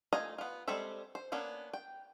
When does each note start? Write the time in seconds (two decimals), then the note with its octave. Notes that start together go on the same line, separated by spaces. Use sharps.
0.13 A3 F4 D#5 G#5 A#5
0.38 B3 F4
0.68 G3 G#3 C4 A4 E5
1.15 C5
1.32 A#3 B3 C#4 D4
1.73 G5